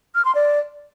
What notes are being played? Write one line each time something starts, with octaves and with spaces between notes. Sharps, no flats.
F6
C6
D5